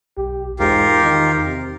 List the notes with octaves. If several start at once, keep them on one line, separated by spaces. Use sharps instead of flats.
B1 G4
E2 G#2 F4 G4 A#4
D#3
C3